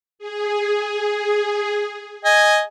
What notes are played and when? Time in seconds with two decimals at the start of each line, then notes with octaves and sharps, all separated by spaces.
0.19 G#4
2.25 D#5 G#5